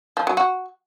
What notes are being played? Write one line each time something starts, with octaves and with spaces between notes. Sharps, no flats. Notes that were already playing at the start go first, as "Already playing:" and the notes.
F3
F#3
F#4